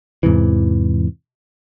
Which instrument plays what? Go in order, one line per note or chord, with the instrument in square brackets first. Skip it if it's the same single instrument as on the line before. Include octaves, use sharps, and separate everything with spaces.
[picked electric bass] E2 G#2 C3 E3